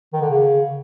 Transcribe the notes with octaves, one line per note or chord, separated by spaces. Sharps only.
D#3
D3
C#3